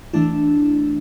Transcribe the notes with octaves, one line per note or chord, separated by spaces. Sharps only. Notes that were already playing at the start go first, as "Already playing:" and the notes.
E3 A3 D4 E4